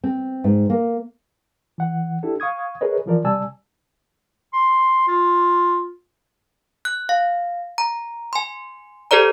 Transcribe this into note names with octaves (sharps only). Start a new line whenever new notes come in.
C4
G#2
A#3
E3 F#5
D4 E4 G4 A4
F5 C#6 D#6 G#6
G#4 A#4 B4 C#5 D#5
E3 F3 A#4 D5
C3 G3 D5 G#5 A5 E6
C6
F4
F#6
F5
A#5
G#5 C6
G4 A4 C5 D5 A#5